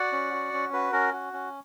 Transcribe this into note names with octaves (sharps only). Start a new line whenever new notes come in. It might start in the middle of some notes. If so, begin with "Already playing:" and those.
Already playing: F#4 D5 F#5
C#4
F#4
C#4
F#4 B4
C#4 A#4
F#4
C#4